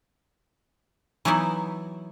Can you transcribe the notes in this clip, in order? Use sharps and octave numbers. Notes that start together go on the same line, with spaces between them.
E3 F#3 B3 D#4 E4